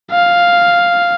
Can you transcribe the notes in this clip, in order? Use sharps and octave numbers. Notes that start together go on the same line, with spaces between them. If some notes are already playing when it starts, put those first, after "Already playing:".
F5